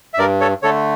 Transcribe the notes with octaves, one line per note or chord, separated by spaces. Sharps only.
E5
G2 A#4 D5
A4 C#5
D3 A3 A4 C#5